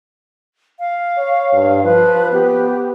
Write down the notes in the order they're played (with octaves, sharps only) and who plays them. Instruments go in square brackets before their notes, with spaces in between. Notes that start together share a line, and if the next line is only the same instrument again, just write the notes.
[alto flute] F5
[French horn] C#5
G2
[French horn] F3 [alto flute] B4
[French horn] B3 [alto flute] G4